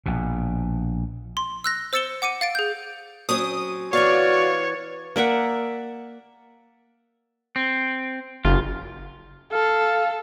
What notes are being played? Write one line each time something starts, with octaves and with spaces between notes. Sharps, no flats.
A#1 B2
C6
E6 F#6 A#6
C5 E6 A6 C#7 E7 G7
F#5 D6 C#7 D#7
F5 A6 D7
G#4 G6
F#3 C4 C#4 D#6
E3 B3 F#4 C#5 D5 F5 C#6
A#3 D5 E5 F#5
C4
F#1 F4
A4 F5